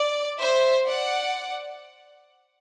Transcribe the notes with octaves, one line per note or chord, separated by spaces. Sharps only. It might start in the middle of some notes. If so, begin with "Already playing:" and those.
Already playing: D5
C5 E5
D5 F#5